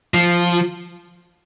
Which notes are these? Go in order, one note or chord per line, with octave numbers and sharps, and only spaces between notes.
F3